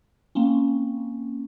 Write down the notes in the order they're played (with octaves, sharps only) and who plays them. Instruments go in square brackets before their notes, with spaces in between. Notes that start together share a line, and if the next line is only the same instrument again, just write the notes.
[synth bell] A#3 C4 C#4